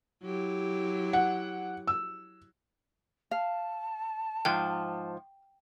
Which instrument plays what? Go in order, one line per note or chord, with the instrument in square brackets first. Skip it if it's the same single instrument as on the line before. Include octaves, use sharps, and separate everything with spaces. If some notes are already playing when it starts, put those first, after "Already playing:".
[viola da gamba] F#3 E4 G4
[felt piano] F#5
E6
[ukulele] F5 [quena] A5
[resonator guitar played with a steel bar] G#2 F3 [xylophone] G5